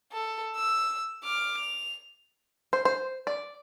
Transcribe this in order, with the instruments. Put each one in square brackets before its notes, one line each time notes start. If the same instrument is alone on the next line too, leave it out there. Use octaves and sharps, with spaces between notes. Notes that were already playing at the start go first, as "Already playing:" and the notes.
[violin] A4
E6
D6 F6
F7
[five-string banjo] C5
C5
D5